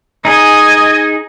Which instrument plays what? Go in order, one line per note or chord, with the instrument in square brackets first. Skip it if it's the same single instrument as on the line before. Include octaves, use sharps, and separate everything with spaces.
[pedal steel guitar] D#4 G#4 [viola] D#5 G#5